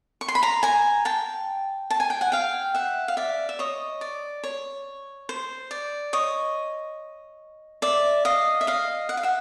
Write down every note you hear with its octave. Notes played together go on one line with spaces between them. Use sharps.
C#6
C6
B5
A#5 C6
G#5 A#5
G5 A5
A5
G#5
G5
F#5 G#5
F5 G5
E5 F#5
F5
D5 E5
E5
C#5 D#5
D5
C#5
C5
D5
C#5 D#5
D5 E5
D#5 F5
E5
D#5 F5
F#5
F5
E5 F#5